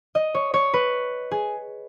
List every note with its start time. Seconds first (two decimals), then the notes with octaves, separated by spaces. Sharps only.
0.15 D#5
0.34 C#5
0.54 C#5
0.74 B4
1.31 G#4